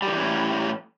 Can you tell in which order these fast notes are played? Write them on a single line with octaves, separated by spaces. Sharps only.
G3 D#3 E3 C#4 A2